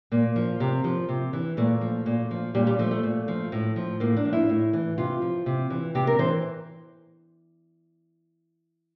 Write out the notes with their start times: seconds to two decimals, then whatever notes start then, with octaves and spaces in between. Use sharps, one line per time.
0.12 A#2 A#3
0.36 F3
0.60 C3
0.84 F3
1.09 C3
1.33 E3
1.57 A#2 A3
1.81 F3
2.06 A#2
2.31 F3
2.54 A#2 G3
2.67 G3
2.79 F3 A3
2.91 A3
3.03 A#2
3.28 F3
3.52 A2
3.76 F3
4.00 A2 A#3
4.17 D4
4.25 F3
4.33 E4
4.49 A2
4.73 E3
4.98 C3 F4
5.22 F3
5.46 C3
5.70 E3
5.95 C3 G4
6.07 A#4
6.19 E3 C5